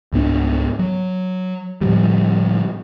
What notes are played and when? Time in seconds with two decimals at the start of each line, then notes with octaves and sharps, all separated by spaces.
0.13 C#2 G#2 B3 D4
0.79 F#3
1.81 A2 D3 F3 G3